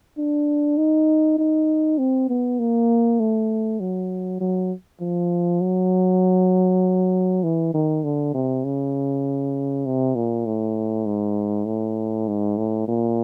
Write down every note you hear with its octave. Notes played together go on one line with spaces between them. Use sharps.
D4
D#4
D#4
C4
B3
A#3
A3
F#3
F#3
F3
F#3
E3
D#3
D3
C3
C#3
C3
A#2
A2
G#2
A2
G#2
A2
A#2